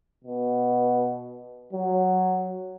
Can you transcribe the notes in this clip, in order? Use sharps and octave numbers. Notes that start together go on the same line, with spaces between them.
B2
F#3